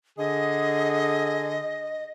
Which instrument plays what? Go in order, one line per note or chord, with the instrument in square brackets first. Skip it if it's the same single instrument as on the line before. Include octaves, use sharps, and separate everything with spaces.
[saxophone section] D3 G#4 [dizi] D#5